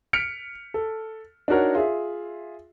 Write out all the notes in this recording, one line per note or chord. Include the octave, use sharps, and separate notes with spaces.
F6 B6 C#7 D7 F7
A4
D4 D#4 F#4 A#4 C#5
F4 G#4 E5